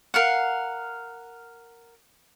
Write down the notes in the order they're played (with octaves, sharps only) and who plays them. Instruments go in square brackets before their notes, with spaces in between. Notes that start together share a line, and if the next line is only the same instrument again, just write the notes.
[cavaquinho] A#4 F5 F#5